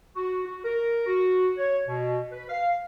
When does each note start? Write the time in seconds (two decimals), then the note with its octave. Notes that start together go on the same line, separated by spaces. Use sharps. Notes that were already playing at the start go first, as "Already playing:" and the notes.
0.16 F#4
0.46 F#4
0.64 A#4
1.06 F#4
1.58 C#5
1.88 B2
2.32 B4
2.49 F5